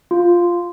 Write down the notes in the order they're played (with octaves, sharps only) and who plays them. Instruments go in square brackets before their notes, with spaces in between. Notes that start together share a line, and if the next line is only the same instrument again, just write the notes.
[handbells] F4